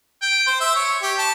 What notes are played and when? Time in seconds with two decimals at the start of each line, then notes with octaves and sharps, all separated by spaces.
0.22 G5
0.47 C5
0.60 E5
0.76 C#5
1.02 G4
1.19 A5